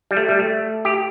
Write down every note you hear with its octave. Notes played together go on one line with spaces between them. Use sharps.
G3
A3
G3
A3
G4